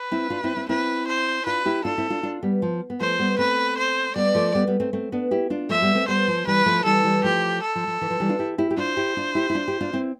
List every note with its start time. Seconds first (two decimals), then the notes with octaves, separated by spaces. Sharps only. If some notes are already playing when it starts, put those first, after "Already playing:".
Already playing: B4
0.11 C4 E4
0.30 D4 F4
0.44 C4 E4
0.56 C4 E4
0.69 C4 E4 B4
1.08 C5
1.46 D4 F4 B4
1.65 E4 G4
1.85 D4 F4 A4
1.98 C4 E4
2.10 D4 F4
2.23 D4 F4
2.43 G3 B3
2.62 F3
2.90 B3
3.00 F3 A3 C5
3.19 G3 B3
3.39 A3 C4 B4
3.78 C5
4.16 G3 B3 D5
4.34 F3 A3
4.55 G3 B3
4.67 G3 B3
4.80 A3 C4
4.93 A3 C4
5.12 B3 D4
5.31 E4 G4
5.50 D4 F4
5.69 F3 A3 E5
5.82 G3 B3
5.95 A3 C4
6.08 G3 B3 C5
6.28 F3
6.47 E3 G3 B4
6.66 F3 A3
6.85 E3 G3 A4
7.04 E3 G3
7.24 F3 A3 G4
7.62 A4
7.75 F3
7.87 F3
8.01 E3
8.10 F3
8.20 E3 G3
8.29 D4 F4
8.39 E4 G4
8.58 E4 G4
8.71 G4
8.77 D4 F4 C5
8.97 E4 G4
9.17 D4 F4
9.35 E4 G4
9.50 E4
9.55 D4 F4
9.68 E4 G4
9.81 D4 F4
9.93 C4 E4